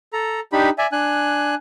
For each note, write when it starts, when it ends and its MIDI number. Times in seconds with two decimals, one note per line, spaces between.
0.13 0.40 69
0.13 0.40 82
0.52 0.70 62
0.52 0.70 63
0.52 0.70 67
0.52 0.70 83
0.78 0.87 74
0.78 0.87 76
0.78 0.87 80
0.92 1.55 62
0.92 1.55 80
0.92 1.55 90